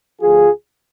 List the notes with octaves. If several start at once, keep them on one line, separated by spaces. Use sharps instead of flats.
D2 D3 F3 F4 G#4